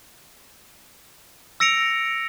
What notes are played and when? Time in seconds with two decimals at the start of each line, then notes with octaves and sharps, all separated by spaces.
1.60 E6 A#6 C#7 D7 F7